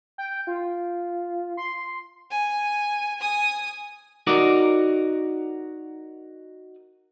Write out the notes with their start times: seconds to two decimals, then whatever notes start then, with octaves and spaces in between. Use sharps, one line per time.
0.18 G5
0.47 F4
1.57 C6
2.31 G#5
3.20 G#5 D#6
4.27 D#4 F#4 A#4 D5